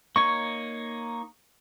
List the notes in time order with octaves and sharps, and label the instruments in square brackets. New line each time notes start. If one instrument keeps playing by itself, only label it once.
[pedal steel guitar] A#3 D#4 C#5 [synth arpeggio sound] C#6